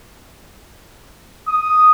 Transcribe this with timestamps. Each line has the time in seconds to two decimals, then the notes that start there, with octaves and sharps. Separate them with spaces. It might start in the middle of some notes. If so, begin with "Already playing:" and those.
1.48 D#6